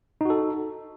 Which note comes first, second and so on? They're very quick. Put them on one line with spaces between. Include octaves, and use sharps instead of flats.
D#4 F#4 A4